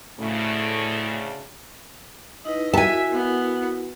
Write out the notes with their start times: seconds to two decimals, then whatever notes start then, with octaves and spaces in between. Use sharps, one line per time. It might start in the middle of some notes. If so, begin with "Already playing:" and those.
0.20 D2 A2 C#3 A3
2.45 D#4 E4 B4 D#5
2.74 E4 F#4 A#4 E5 G#5 A5
3.13 B3